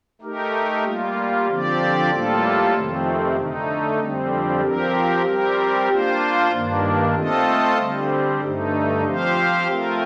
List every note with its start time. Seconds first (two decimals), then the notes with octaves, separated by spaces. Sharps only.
0.21 A3 D#4 G4 A#4
0.85 G3 A#3 F4
1.47 D3 F3 C4 G4 D5
2.10 A2 G3 A#3 F4 A4
2.73 F2 C3 D#3 A3 C4
3.37 D3 A3 D#4
3.99 F2 D3 G3 C4
4.62 F3 C4 G4 A#4
5.25 G3 C4 G4 A#4
5.89 A#3 D4 F4 C5
6.52 G2 D#3 A#3 D4
7.15 A3 C4 F4 A4 D#5
7.78 D3 G3 C4
8.41 G2 D3 A3 D#4
9.04 F3 C4 G4 C5 F5
9.67 A3 C4 F4 A#4